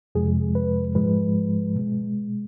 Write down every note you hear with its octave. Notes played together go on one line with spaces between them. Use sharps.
F2 C3 F3 G#3 G#4
B4
G#2 F3 G#3 B4
B2 G#3